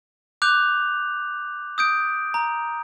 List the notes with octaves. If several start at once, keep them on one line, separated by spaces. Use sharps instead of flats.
D6 F#6 G6 F7
D#6 G6 D7
A#5